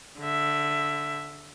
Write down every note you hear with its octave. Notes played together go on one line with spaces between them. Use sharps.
D3 E5